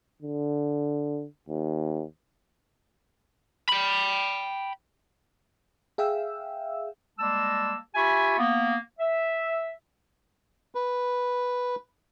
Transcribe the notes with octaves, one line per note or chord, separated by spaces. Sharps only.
D3
D#2
G5 B5
G#4 E5 F5 G5 E6
G3 G#3 A#3 A5 E6
F4 G4 E5 G#5 B5 C#6
A#3 B3
E5
B4